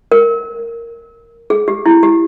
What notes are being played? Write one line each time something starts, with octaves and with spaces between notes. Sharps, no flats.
A#4
G#4
G4
E4
G4